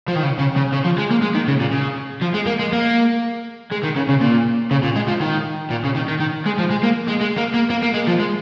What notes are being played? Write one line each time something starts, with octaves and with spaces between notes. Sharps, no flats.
F3
D#3
C#3
C#3
C#3
C#3
F3
G#3
A#3
G#3
D#3
C#3
A#2
C#3
F3
G#3
A#3
G#3
A#3
G#3
D#3
C#3
C#3
A#2
C#3
A#2
G#3
F3
D#3
A#2
C#3
D#3
D#3
D#3
G#3
F3
G#3
A#3
G#3
G#3
A#3
A#3
A#3
A#3
G#3
F3
G#3